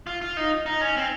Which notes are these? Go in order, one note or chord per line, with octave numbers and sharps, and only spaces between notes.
F4
F4
D#4
D#4
C#4
C4